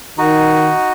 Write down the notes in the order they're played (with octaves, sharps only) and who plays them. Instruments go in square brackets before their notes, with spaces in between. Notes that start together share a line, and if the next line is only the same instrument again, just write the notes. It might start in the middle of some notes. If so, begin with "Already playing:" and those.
[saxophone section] D#3 [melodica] D#4 F#4